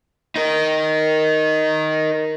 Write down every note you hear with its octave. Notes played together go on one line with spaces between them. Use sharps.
D#4 A#4